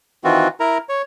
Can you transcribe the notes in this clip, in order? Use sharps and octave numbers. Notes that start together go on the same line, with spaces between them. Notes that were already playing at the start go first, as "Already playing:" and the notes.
D#3 E3 C4 F4 F#4
E4 A#4 A#5
C#5